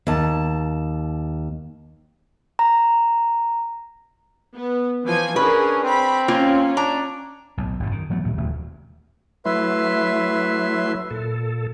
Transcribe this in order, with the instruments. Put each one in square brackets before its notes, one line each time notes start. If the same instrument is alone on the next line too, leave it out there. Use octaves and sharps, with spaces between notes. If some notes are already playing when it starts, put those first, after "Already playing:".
[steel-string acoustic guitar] D#2 A5
[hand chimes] A#5
[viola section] B3
E3 F3 G#5
[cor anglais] C#4 [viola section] D4 G#4 A#4 [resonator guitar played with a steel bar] B4
[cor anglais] C4 [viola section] B5
[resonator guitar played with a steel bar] A#3 F4 [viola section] C#4
[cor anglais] D4 [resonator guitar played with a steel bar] A#5
[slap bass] B1 A2
G#1 F#2 A2
D#3
E3 F#3 A3 B3
D2 G2 A#2 D#3
E1 D#2 C#3 A3
[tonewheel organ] F#3 A3 E4 [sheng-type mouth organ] B4 E5 C6
[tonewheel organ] A#2 A4